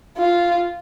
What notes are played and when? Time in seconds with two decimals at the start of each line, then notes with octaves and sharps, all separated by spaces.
0.18 F4